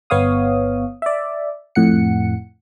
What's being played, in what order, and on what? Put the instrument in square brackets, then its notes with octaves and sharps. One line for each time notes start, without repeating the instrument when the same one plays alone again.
[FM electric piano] G1 B3 C#5 F5 D#6
D5 E5
F2 A2 F#5 C#7